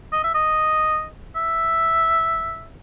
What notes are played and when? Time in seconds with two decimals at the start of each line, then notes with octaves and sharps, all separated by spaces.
0.12 D#5
0.24 E5
0.34 D#5
1.36 E5